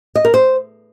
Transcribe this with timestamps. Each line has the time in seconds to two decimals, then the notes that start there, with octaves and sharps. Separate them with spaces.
0.15 D#5
0.25 A#4
0.34 C5